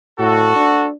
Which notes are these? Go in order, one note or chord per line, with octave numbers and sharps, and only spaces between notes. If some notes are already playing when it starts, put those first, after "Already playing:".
A2 F#4 A4
D4